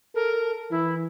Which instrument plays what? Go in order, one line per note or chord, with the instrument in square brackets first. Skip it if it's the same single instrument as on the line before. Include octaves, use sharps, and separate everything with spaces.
[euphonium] A4 [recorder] A#4
[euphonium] E3 [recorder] E4